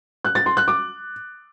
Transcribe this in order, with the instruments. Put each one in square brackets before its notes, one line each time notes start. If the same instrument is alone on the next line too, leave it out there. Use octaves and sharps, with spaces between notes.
[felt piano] F#6
A6
C6
F#6
D6